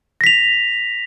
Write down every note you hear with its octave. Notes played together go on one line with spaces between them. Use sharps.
A#6 B6 F7